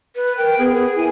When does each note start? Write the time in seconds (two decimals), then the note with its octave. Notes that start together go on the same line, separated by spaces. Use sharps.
0.16 B4
0.38 A#4 G5
0.59 B3 G#4
0.74 G#4
0.96 E4 G#5